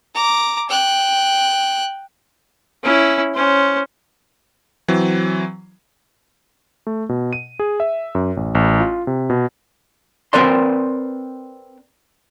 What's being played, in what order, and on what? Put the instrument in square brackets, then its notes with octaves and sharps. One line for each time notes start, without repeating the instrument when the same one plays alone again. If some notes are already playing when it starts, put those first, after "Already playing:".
[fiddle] A#5 D6
G5 F#6
[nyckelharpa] C#4 E4
C#4 C5
[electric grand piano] E3 F#3 C4
A3
B2
D#7
G#4
E5
F#2
A1
A1
F4
C3
B2
[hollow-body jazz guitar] C4 A#4 B4 D5 C6